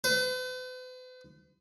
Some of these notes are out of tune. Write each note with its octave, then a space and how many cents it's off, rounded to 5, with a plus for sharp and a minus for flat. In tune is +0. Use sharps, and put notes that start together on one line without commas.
B4 +45